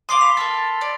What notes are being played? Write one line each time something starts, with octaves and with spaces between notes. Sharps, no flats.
F5 C6 D6 D#6 C7 G7
B5 B6 F7
A4 A#4 A6
D5